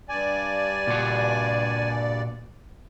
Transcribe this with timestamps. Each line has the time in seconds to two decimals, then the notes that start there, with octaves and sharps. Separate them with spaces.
0.09 G2 D5 G#5
0.87 A#2 F#4